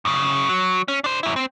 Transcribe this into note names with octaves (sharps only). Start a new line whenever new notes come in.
F#2 C#3
F#3
C#4
D4 C5
F#2 E4
C4